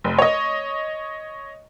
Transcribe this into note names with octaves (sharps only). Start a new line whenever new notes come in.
F1
C#5 D#5